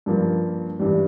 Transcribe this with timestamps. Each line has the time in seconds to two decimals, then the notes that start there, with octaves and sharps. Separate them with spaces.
0.06 G2 F3 A#3
0.79 G2 E3 G3